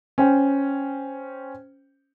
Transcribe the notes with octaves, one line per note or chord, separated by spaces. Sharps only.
C#4 C5 G5